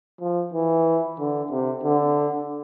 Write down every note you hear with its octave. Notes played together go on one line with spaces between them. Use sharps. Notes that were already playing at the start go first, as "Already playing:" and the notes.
F3
E3
D3
C3
D3